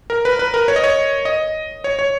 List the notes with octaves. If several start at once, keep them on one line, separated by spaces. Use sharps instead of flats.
A#4
B4
B4
A#4
C#5
D#5
C#5
D#5
C#5
C#5